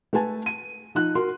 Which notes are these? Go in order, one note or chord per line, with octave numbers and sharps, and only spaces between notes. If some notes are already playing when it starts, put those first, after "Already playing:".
A3 A4 B4 G#5 A5
D#7
F3 D#4 F#6
F#4 A#4 C6